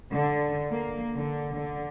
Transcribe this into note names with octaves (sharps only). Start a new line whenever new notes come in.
D3
A#3
D3
D3